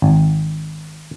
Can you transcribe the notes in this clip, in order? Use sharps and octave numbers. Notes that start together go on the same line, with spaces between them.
G#1